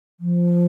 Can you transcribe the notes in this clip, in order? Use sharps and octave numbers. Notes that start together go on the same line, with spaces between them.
F3